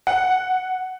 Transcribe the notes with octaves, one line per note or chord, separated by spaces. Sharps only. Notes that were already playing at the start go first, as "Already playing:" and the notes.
F#5